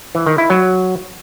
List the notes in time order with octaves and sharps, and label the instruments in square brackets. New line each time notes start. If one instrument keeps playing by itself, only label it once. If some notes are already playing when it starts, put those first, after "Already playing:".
[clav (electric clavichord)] E3
D#3
E4
F#3